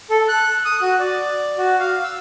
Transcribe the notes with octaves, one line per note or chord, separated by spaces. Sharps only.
A4
F#6
D#6
F#4
D5
F#4
F5
E6